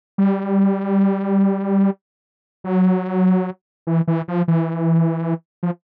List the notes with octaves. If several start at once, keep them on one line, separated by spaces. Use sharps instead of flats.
G3
F#3
E3
E3
F3
E3
F3